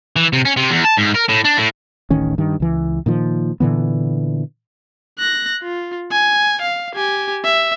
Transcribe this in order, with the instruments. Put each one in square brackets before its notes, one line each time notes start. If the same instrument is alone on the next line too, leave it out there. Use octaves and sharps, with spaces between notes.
[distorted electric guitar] E3
C3
C#4
C3
E2
A5
G#2
A#4
A2
D4
A2
[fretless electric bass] D1 A1 D#3 C#4
G2 D#3
C#2 E3
A#2 D#3 F3
A#2 D3 E3 B3
[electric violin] F#6 A#6
F4
G#5
F5
G4 G#5
E5